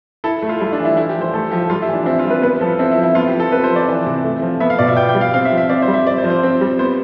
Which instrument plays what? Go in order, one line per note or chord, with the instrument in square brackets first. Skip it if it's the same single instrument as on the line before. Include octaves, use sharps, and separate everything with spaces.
[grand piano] E4 [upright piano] A4
[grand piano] A3
[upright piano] F4
[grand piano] G3 [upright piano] E4
[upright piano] D4
[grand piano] E3
[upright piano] E4
[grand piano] A3 [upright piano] E4
[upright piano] G4
[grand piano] F3
[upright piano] C5
[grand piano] A3 [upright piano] A4
[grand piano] F3 [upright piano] G4
[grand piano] G3 [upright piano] F4
[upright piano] E4
[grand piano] E3
[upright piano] D4
[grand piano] C4 [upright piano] E4
[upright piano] F4
[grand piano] G3
[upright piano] B4
[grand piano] B3 [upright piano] B4
[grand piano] F3 [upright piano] A4
[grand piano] C4 [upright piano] E4
[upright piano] E4
[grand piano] F3
[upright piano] E4
[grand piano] B3 [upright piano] F4
[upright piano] G4
[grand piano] F3
[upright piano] A4
[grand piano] C4 [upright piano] B4
[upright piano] C5
[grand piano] F3
[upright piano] D5
[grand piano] E3
C3
A3
F3
[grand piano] B3 [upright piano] E5
[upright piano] F5
[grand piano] B2 [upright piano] D5
[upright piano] E5
[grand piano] B3 [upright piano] G5
[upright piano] G5
[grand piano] G3
[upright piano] F5
[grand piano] C4 [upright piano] F5
[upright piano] E5
[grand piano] F3
[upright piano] E5
[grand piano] C4 [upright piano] D5
[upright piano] C5
[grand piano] G3
[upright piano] E5
[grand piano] C4 [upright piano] D5
[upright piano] C5
[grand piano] F3
[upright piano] C5
[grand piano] C4
G3
[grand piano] B3 [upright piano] C5